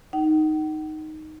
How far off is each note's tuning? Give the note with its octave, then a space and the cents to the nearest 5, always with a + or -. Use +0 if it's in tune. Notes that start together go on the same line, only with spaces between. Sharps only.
D#4 +0 F#5 +45